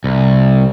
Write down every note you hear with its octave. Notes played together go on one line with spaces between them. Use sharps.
C2